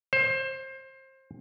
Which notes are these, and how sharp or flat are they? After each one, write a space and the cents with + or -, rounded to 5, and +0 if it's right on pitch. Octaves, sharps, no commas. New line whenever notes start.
C5 +25